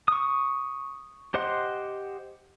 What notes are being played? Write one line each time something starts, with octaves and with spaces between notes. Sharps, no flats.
C#6 D#6
G4 C5 D#5 F#5 C6